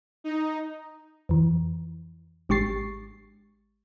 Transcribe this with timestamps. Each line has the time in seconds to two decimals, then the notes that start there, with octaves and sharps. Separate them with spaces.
0.24 D#4
1.29 F2 E3
2.49 G#1 G#3 G4 C#6 A6 C7